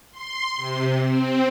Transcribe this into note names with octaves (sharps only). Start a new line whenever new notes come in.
C6
C3
C4